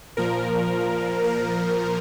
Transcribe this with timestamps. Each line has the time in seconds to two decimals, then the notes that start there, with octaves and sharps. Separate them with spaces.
0.17 A#2 F3 A#4
1.24 A#4